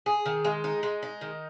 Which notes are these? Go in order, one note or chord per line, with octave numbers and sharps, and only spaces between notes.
G#4
D#3
G#3
D#4
G#3
D#4
D#3